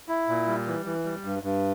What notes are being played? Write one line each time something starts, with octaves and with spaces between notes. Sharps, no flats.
E4
A#2
G3
E3
E3
G3
G2
G2